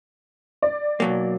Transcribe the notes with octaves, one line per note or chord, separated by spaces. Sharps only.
D5
B1 F#3 A#3